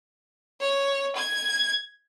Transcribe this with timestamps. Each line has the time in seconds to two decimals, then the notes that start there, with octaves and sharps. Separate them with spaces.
0.61 C#5
1.16 G#6